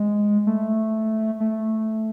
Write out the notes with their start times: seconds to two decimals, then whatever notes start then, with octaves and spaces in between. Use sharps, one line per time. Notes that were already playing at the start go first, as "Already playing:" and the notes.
Already playing: G#3
0.47 A3
1.40 A3